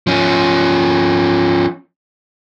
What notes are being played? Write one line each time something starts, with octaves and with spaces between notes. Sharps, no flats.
F3 C#4